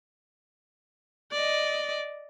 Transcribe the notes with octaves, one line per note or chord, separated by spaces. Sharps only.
D5 D#5